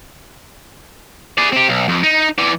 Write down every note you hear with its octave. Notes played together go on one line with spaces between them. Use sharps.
G#4 D5
C4 G4
B1
F2
D#4
E3 D5